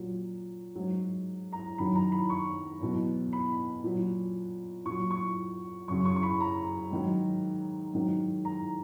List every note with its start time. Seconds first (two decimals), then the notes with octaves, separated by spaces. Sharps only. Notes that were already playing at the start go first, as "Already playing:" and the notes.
Already playing: A#2 F#3
0.75 G#2 F#3
1.53 A#5
1.78 F#2 D#3 F#3 B5
1.95 A#5
2.12 B5
2.30 C#6
2.80 E2 B2 F#3
3.33 B5
3.84 A#2 F#3
4.85 A#2 F#3 C#6
5.11 C#6
5.88 F#2 C#3 F#3 C#6
6.05 C#6
6.16 C#6
6.23 B5
6.41 A#5
6.91 G#2 D#3 F#3
7.93 G#2 D#3 F#3
8.45 A#5